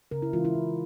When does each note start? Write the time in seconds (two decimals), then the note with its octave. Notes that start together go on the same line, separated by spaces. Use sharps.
0.11 C#3 A#4
0.22 E4
0.33 E3 G#3 F4
0.45 E4
0.55 C#3